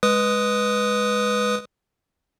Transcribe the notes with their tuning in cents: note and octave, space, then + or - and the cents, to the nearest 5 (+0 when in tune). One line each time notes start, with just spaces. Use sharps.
G#3 +0 B4 +0 D#6 +0